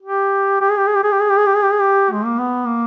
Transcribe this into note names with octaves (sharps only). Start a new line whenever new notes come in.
G4
G4
G#4
G4
G#4
G4
G#4
G4
G#4
G4
G#4
G4
G#4
G4
G#4
G4
G#3
A#3
B3
A#3